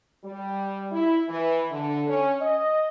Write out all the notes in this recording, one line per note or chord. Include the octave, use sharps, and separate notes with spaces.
G3
E4
E3
D3
C#4
D#5